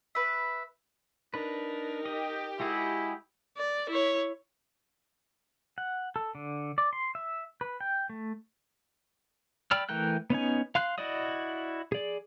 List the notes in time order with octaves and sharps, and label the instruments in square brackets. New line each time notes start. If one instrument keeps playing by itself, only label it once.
[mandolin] B4 E5
[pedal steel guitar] D4 B4 [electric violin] D#4 A#4
[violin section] G4 [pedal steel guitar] D#5
[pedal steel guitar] G#3 F#4 G#4 [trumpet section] E4
[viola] D5
E4 C#5
[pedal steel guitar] F#5
A4
D3
D5
C6
E5
B4
G5
A3
D5 G5 B5 E6 F6
E3 A3 A#4 G5 F#6
B3 C#4 D#4 G#5
F5 C6 F#6
E4 F#4 D5 D#5 D#6
G#4 D5